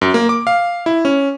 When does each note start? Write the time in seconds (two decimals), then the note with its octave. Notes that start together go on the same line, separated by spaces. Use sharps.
0.01 F#2
0.14 A#3
0.29 D6
0.47 F5
0.86 E4
1.05 C#4